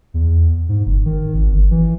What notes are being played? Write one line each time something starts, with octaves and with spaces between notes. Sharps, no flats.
E2
G#2
F#1
D#3
G#1
G1
E3